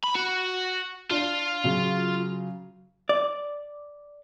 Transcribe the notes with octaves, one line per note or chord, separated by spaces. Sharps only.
B5
F#4
D4 F4
C#3 F#3
D5